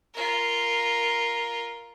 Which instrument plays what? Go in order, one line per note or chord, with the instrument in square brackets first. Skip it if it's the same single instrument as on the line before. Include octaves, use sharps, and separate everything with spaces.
[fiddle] F4 A#4